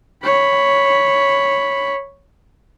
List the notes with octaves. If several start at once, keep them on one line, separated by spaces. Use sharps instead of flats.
C#5 B5